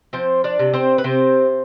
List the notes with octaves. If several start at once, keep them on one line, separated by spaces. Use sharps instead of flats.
F3 C4 C5
D4 D5
C3
C4 C5
B4
C3 C4 C5